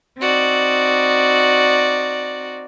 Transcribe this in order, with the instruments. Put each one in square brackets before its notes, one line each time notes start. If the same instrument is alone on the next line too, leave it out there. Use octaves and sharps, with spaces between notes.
[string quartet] C4 D#4 F#4 D5